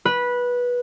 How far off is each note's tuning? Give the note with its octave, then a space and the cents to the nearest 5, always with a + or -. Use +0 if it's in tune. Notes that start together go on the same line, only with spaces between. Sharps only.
B4 -15